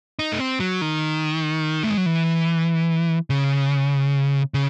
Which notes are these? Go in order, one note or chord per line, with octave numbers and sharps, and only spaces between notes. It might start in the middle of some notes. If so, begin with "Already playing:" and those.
D#4
A3
C4
F#3
D#3
A3
G#3
F#3
E3
C#3
C#3